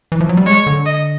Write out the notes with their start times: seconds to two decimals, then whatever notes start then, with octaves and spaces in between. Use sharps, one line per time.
0.12 E3
0.20 F3
0.29 F#3
0.37 G3
0.46 G#3 C#5
0.67 D3
0.86 D#5